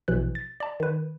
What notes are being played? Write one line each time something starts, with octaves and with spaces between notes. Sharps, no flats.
A#1 B2 E3 F#6
A6
D5 A5
D#3 B4